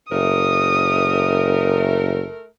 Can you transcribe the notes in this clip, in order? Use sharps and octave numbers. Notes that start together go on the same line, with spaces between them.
F#1 A3 A#4 D#6